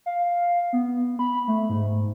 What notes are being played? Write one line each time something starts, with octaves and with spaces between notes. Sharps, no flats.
F5
B3
B5
A3
G#2